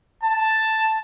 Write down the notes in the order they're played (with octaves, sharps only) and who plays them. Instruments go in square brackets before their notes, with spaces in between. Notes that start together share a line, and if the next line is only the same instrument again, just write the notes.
[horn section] A5